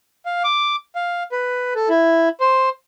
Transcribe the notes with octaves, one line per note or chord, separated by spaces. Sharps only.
F5
D6
F5
B4
A4
E4
C5